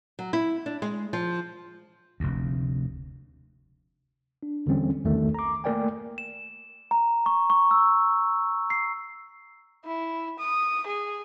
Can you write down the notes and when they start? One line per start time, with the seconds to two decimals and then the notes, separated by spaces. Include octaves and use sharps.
0.19 F#3
0.33 E4
0.66 D4
0.82 G#3
1.13 F3
2.20 F1 D2
4.43 D4
4.66 E2 D3 E3 G3 C4 C#4
5.05 B1 E2 D#3 A3
5.34 A#5 D6
5.64 A3 A#3 A#4 D5 G5 G#5
6.18 E7
6.91 A#5
7.26 C#6
7.50 C#6
7.71 E6
8.70 C7
9.85 E4
10.39 D#6
10.87 G#4